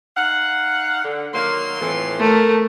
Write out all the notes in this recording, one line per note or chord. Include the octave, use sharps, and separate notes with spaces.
D#4 F5 F#5
D3
D#3 F#3 A#3 C6
F2 A2 E3
A3 A#4